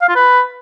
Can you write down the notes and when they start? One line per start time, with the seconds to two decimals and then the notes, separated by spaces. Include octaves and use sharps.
0.02 F5
0.09 F4
0.16 B4